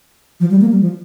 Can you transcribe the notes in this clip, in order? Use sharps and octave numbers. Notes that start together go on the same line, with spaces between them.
F3
G3
A#3
G3
F3